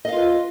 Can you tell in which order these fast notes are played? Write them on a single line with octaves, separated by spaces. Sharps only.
D#5 F5 F4 B4